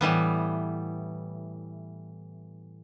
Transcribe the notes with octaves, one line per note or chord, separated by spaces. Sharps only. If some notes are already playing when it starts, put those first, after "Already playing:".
A2 E3 G3 B3